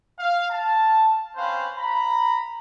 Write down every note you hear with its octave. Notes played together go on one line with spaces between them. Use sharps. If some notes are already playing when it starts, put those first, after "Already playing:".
F5
A5
C4 C#4 B4 C5 F5
A#5 B5